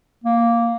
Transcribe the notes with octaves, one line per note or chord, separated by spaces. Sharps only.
A#3